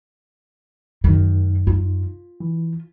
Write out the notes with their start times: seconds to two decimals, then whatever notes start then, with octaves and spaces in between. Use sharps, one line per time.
1.04 F#2 D#3 D#4
1.67 F4
2.40 E3